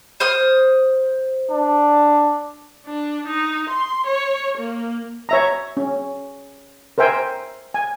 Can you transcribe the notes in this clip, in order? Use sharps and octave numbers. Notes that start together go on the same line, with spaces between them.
C5 D#6 F6
D4
D4
D#4
C6
C#5
A#3
C#5 E5 A#5
C#4
A#4 C5 E5 G5 G#5
G#5